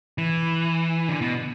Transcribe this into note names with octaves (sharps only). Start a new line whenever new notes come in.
E3
D3
B2